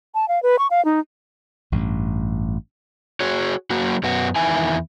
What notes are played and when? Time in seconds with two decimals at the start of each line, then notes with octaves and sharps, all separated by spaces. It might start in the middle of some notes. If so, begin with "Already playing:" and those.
0.15 A5
0.28 F5
0.43 B4
0.59 C#6
0.71 F5
0.85 D#4
1.72 A1 G2
3.20 F#4 G#4 C#5
3.70 F#3 A#3 F#4
4.03 F#2 F#3 B3 F#4
4.36 E2 D#3 E4 G#5